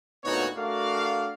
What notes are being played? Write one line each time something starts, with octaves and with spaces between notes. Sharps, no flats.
D2 A#2 B3 D#4 F#4 C#5
A3 D4 F#4 A#4 D5 F5